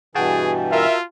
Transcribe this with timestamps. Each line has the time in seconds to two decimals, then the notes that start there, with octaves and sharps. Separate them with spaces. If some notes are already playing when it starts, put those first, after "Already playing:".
0.15 G2 B2 E3 F#4 G#4 G5 A5
0.72 F4 A#4 E5